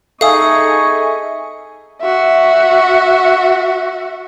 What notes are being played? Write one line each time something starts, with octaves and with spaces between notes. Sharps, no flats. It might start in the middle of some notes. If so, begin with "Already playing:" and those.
D#4 G#4 A4 E5 F5 G#5 C#6 D#6
F#4 E5